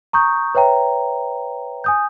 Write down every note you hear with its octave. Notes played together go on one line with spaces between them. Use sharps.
A#5 C#6 D#6 G6
B4 C#5 E5 G5 A#5
G#5 D#6 G6